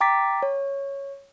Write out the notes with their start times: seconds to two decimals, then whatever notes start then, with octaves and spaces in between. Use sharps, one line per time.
0.01 G5 A#5 D6 A6 B6
0.43 C#5